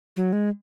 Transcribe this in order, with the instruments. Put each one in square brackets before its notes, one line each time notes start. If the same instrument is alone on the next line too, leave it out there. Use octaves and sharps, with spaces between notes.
[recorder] F#3
G#3